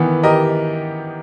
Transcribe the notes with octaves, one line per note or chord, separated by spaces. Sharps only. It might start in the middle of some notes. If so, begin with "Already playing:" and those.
Already playing: D#3 E3 B3
G4 A#4 D#5